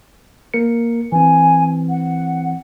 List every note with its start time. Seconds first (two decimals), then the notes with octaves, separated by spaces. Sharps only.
0.54 A#3 A#4 C#7
1.12 E3 C4 G#5
1.90 F#5